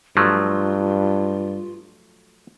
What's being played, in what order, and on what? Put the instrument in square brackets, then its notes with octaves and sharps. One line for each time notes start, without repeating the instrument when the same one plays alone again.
[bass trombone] G2 [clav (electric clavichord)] F3 F#3 A3 [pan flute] F4